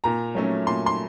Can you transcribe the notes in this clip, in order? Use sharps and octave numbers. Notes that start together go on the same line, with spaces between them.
A#2 A#5
F#3 A3 C#4
A#2 C6
C6